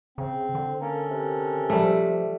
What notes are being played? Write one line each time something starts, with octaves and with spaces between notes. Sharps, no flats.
C#3 C4
D3
A#3 C#4 A4 A#4
C3
F3 G3 A3